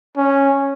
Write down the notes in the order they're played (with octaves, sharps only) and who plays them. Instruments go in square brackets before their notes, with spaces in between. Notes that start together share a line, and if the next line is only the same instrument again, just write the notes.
[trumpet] C#4